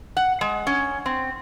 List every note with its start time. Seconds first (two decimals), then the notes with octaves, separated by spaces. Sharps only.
0.17 F#5
0.41 G#3
0.67 C#4
1.06 C4